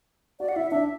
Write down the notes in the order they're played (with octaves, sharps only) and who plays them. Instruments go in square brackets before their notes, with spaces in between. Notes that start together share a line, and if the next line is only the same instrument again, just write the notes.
[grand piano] F#4 [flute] D5
[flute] F#5
[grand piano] E4 [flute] E5
[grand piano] D4 [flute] E5